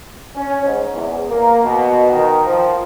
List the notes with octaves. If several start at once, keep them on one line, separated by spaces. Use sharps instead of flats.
C#4
G#2
E2
A#3
B2
D#3
F3